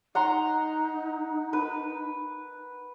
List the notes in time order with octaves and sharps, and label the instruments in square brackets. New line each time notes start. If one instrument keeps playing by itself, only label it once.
[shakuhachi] D#4 [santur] F#5 A#5 C6
[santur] B4